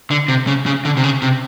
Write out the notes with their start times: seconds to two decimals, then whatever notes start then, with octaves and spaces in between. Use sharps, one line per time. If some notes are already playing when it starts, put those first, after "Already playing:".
0.11 D3
0.28 C3
0.47 C#3
0.66 C#3
0.85 D3
0.97 C3
1.04 C#3
1.22 C3